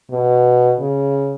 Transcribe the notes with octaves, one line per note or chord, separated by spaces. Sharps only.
B2
C#3